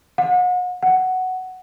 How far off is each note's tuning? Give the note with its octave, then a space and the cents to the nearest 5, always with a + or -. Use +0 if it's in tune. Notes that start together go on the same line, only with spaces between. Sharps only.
F#5 -40
F#5 +5